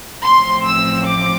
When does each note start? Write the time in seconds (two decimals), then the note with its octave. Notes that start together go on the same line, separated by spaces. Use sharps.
0.24 A1 A2 F3 C4 C6
0.65 E6
1.06 D6